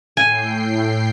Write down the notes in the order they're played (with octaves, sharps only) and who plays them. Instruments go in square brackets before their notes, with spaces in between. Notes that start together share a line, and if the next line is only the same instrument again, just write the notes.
[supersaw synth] A2 G5 C7 [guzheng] G#5